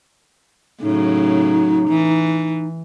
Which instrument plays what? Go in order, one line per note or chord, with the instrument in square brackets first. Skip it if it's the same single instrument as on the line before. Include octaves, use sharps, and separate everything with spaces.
[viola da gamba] A2 C#3 F#3 [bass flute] D#4
[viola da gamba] E3